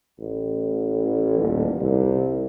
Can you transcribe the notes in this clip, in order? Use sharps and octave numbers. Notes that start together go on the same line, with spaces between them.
A1
D#1
C2